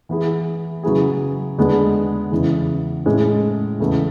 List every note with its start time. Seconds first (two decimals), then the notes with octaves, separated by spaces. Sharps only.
0.09 E3 B3 E4 G#4
0.83 C#3 F#3 B3 E4 G#4
1.58 E2 D3 G#3 B3 D4
2.31 E2 C#3 E3
3.06 A2 G#3 C#4 E4
3.80 E2 C#3 E3 A3